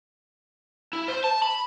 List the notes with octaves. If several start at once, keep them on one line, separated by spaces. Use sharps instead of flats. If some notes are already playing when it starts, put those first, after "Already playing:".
E4
C5
A5
B5